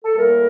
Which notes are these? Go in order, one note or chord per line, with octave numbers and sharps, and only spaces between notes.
A4
A2 G3 A#3 A#4